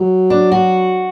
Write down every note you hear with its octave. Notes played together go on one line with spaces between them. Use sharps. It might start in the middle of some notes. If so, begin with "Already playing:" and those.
Already playing: F#3
D4
F#4